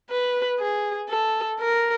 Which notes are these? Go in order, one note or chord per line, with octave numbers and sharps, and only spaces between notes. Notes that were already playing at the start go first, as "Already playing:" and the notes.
B4
G#4
A4
A#4